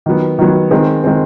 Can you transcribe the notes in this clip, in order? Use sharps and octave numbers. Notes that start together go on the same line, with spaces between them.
D#3 F#3 B3
D#3 F#3 B3
D#3 G#3 C4
D#3 G#3 C4